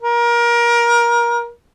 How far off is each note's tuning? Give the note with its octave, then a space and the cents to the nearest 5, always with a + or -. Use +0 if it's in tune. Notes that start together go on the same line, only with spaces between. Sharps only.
A#4 +25